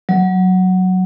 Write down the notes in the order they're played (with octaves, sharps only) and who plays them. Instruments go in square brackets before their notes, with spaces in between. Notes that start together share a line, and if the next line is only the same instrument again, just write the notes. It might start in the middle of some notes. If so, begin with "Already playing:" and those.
[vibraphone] F#3